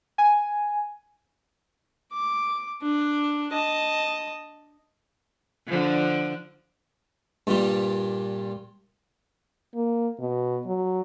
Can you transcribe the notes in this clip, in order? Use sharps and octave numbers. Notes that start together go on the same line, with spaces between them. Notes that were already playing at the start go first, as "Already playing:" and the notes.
G#5
D6
D4
D#5 A5
D3 F3
G2 A#2 G3
A#3
B2
F#3